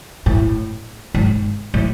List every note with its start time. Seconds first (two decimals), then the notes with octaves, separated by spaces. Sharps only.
0.26 A2
1.14 G#2
1.74 A2